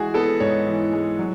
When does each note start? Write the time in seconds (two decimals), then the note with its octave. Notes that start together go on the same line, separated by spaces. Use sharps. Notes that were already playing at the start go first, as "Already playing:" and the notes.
Already playing: E3 G#3 F#4 G#4
0.14 B3 A4
0.40 G#2 C#5
0.67 E3
0.93 G#3
1.19 F#3